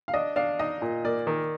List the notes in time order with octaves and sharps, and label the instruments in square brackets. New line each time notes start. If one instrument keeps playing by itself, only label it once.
[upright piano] F5
[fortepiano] D4 [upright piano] D#5
[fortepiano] D4 [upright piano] F5
[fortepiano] D#4 [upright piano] D#5
[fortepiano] A#2
[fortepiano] A#3 [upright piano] D5
[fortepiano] D#3